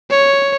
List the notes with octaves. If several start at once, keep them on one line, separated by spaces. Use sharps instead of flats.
C#5